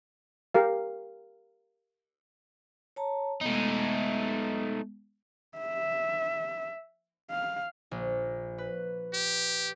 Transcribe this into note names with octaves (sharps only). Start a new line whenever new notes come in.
G4 A#4 F5
C#5 A5 A#5
G#3 A3 B3 D#4
E5
F5
A#1
B4
G4